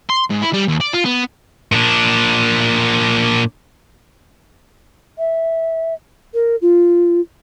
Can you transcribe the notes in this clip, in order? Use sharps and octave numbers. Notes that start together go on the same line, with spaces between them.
C6
G#2
E4
G3
D#2
D5
F4
B3
A#2 D4
E5
A#4
F4